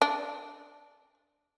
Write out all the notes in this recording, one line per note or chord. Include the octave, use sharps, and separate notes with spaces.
D4